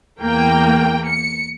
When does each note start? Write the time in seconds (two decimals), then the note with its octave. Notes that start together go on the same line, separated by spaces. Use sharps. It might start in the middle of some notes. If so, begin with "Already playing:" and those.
0.20 E2 A#3 G5
1.10 C#7